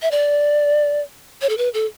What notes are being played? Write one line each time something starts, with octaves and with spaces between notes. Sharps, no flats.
E5
D5
C#5
A4
B4
A4